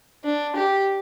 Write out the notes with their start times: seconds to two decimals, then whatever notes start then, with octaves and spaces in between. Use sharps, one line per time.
0.25 D4
0.56 G4